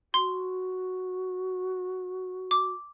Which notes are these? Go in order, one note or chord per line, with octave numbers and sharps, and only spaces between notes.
F#4 C6
D6